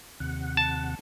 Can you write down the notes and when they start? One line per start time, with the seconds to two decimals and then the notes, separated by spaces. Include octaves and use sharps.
0.20 D#2 C3 F#5
0.57 A5